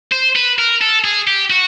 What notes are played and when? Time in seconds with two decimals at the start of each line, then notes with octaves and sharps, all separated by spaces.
0.12 C5
0.36 B4
0.58 A#4
0.81 A4
1.04 G#4
1.27 G4
1.50 F#4